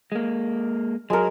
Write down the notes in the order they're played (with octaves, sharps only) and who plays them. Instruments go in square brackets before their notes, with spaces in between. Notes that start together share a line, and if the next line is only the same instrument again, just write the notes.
[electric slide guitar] G#3 A#3
[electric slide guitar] F#3 [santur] G#3 A#4